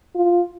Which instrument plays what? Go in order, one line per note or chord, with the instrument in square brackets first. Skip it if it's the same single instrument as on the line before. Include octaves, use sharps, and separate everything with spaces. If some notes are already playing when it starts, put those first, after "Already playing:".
[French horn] F4